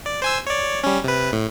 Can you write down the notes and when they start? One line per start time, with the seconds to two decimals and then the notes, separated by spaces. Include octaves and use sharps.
0.06 D5
0.22 C5 G#5 E6
0.47 C#5 D5
0.84 G3 C#4
1.04 C3 B4
1.32 A2